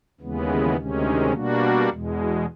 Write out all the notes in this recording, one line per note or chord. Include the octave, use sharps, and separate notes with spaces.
D#2 C#3 E3 G#3 B3
D2 C3 D#3 G#3 C#4
B2 G3 A#3 D4 F#4
E2 B2 G#3